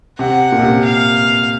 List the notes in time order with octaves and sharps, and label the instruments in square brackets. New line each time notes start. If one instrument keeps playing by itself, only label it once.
[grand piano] C3 [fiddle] F#5
[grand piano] A#2
C3
A#2
[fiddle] F5